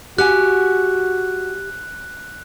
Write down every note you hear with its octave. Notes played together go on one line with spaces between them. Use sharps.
F#4 G4 F#5 G#5 F#6